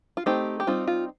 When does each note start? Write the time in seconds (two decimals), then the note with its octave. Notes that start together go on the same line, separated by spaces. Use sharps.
0.17 F4
0.26 A3 C4 D#4 G4
0.60 G4
0.67 G3 C4 D#4 F4
0.87 F4